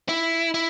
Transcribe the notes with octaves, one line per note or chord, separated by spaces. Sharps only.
E4
E4